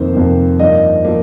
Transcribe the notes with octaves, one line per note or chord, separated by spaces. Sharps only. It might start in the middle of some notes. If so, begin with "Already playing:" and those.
Already playing: F2 C3 D#3 A#3 C4 C5
F2 C3 D#3 A#3
G2 F3 A#3 D#4 D#5
F3 A#3